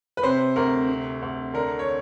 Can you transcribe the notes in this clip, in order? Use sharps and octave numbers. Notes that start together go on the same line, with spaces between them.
B4
C3 C5
D2 A#4
C3
D2
D3 A#4
C#5